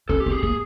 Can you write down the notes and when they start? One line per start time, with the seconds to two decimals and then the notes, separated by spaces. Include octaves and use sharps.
0.09 C#4 A4
0.20 G4
0.26 C4
0.32 G#4
0.43 A#3 G#4